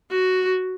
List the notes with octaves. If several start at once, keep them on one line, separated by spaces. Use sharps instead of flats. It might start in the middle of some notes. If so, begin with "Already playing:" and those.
F#4